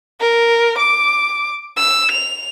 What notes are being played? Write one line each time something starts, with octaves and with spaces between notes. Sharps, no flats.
A#4
D6
E6
F7